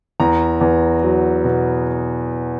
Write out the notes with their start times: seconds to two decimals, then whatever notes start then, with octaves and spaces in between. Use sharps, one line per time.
0.20 E2 A#5
0.61 E2
1.03 F#3
1.44 B2